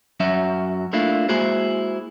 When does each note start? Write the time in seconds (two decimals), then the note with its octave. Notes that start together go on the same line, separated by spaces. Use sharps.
0.20 F#2 F#3 C#4 F#4 E5
0.93 A3 A#3 D4 E4 F4
1.29 G#3 A#3 E4 F#4 G#4 C5